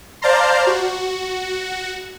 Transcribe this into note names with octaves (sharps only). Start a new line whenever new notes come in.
C5 D5 F5 A5 A#5 C6
F#4